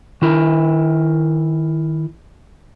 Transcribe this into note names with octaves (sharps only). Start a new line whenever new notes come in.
D#3 E4 A#4